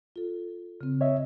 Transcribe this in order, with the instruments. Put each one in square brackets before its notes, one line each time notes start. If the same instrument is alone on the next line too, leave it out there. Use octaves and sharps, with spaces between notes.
[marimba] F4 A4
C#3 C4
[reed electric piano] C#5 D#5 E5